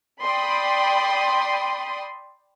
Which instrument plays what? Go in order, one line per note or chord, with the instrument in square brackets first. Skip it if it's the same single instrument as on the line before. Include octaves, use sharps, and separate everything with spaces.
[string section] D5 G5 B5 C6 D#6